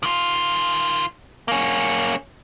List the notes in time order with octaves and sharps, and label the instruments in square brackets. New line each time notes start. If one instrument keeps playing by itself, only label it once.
[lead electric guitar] D#3 F4
A#3 C#4